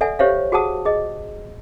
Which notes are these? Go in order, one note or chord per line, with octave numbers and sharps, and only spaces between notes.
A4 D5 E5 F#5 G#5
G4 C5 C#5 E5 F5
F#4 G#4 C5 F#5 A5 D#6
G#4 D#5